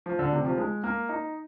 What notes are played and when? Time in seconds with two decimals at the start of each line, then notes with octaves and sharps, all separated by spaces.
0.06 F3
0.19 D3
0.32 C3
0.45 F3
0.58 G#3
0.84 A#3
1.09 D#4